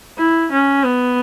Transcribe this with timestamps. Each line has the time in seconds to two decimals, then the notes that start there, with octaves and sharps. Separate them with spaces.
0.18 E4
0.52 C#4
0.85 B3